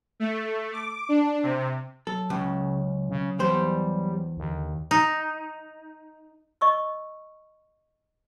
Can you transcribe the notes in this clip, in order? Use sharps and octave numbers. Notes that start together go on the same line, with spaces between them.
A3
D6
D4
C3
F#3 A4
C#2 C#3
C#3
E2 G3 C5
D#2 D3
D#4
D#5 C#6 E6